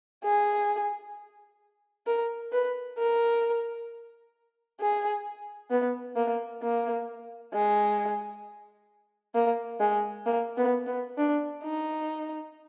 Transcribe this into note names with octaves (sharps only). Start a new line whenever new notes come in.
G#4
A#4
B4
A#4
G#4
B3
A#3
A#3
G#3
A#3
G#3
A#3
B3
B3
D4
D#4